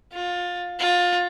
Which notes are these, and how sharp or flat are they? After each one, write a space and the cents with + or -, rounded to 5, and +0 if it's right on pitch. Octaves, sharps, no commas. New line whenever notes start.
F4 +20
F4 +20